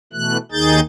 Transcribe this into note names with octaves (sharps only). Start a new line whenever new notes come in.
B2 E3 A3 F#6
D#2 D#3 D#4 G#4 G6 A6